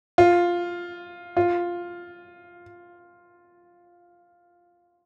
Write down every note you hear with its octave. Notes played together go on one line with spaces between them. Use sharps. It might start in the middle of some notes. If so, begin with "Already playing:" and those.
F4
F4